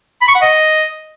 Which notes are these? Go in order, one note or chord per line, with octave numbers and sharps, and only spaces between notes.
B5
C#6
F#5
D#5